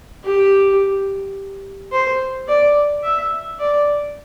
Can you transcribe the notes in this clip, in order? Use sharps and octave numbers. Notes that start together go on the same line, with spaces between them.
G4
C5
D5
E5
D5